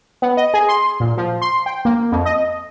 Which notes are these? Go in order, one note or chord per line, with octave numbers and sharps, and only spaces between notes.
B3
D#5
G#4
C6
A#2
F3
C6
G5
A#3
F2
D#5